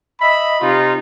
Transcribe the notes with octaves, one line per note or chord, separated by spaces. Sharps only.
D#5 E5 B5
C3 D#4 F4